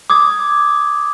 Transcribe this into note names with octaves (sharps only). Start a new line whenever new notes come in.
D6 D#6 G#6